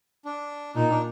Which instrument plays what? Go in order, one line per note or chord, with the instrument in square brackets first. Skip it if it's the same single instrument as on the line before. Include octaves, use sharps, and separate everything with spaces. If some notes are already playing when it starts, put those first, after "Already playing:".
[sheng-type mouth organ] D4
[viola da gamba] A#2 [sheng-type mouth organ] D#4
[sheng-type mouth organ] D4